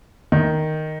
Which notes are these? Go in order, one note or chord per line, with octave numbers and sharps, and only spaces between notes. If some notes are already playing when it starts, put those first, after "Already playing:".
D#3